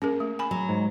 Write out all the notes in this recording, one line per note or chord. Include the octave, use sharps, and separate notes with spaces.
A#3 C#4 G#4 A#4
A3
G#5 B5
F#3
G#2